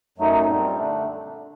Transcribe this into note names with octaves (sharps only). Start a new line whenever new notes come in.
F#2 F#3 A3 D#4
A#2 G3 C4
D3 A3 D4